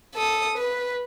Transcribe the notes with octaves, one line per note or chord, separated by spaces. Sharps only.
A4 D#6
B4